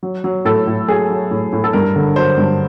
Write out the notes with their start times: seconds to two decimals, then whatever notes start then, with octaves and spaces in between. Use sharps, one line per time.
0.03 F#3
0.24 F#3
0.45 A2 A4
0.67 A2
0.88 F#3 G#4
1.10 F#3
1.31 A2
1.53 A2
1.64 A4
1.73 G2 A#4
1.96 D3
2.16 F#3 C5
2.38 G2